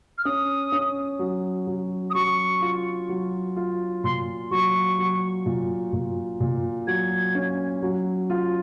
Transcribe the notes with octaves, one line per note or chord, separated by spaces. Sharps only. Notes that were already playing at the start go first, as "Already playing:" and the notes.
F6
C#4 D#6
C#4
F#3
F#3
D#6
F#3 C#6
F4
F#3
F4
A#2 C6
F#3 C#6
F#3
A#2
A#2
A#2
F#3 G#6
C#4
F#3
F4